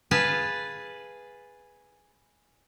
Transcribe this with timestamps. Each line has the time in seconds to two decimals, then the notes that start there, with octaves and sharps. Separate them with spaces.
0.11 G#4 B4 F5 A5